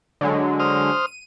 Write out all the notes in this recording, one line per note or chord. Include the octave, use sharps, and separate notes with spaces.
D3 F#3 G#3
C5 D#6 F6
D#7